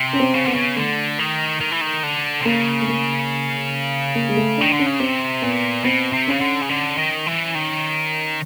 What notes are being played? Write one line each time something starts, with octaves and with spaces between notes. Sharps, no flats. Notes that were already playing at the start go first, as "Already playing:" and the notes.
Already playing: C3
C#4
C4
C#3
D3 B3
C#3
D3 A3
D#3
D#3
E3
D#3
D3
C3
C#3 A#3
A3
A#3
A#3
G#3
A3
D#3 D4
D3
C#4
C#3
C3 C4
A#2 B3
B2 C4
C3
C#3 C#4
D3
C#3
D3
D#3
E3
D#3